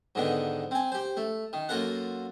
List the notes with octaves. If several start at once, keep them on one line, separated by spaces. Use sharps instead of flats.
G#2 D3 D#3 B3
C4 G#5
G4 C5
A3
D#3
F#2 A#3 F4 A4 A#4 F#5